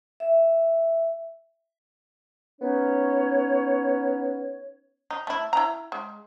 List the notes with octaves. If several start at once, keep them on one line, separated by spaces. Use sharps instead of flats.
E5
B3 C#4 D#4 C#5
D#4
A3 E4
E4 A#5
G#3